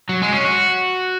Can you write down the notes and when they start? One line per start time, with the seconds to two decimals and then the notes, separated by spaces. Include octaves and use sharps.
0.09 F#3
0.22 G#3
0.33 C#4
0.45 F#4